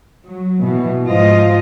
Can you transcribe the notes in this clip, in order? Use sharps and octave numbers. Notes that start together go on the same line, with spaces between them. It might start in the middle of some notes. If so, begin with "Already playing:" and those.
F#3
B2 E3
G#2 F3 F4 D#5